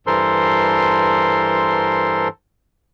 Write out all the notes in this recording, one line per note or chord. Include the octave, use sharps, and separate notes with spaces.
G2 E3 A4 A#4 C5 C6